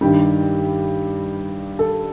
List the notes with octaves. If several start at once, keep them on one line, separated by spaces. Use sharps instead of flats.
G2 D#3 G3 G4
A4